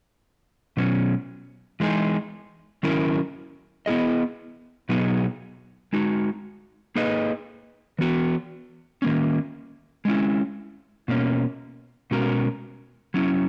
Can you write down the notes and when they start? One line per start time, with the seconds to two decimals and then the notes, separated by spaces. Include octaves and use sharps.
0.77 B2 F#3 C#4
1.80 E3 G#3 D#4 G#4
2.83 D#3 F#3 C#4 E4 A#4
3.86 B3 E4 G#4 D#5
4.89 B2 F#3 B3 D#4 G#4
5.93 G#3 D#4 F#4
6.96 A#3 D#4 G#4 B4 D#5
7.99 E3 B3 F#4
9.02 D#3 A#3 C#4
10.05 G#3 C#4 E4
11.08 B2 A#3 C#4
12.11 B2 G#3 C#4 F#4 A#4
13.14 F#3 C#4 E4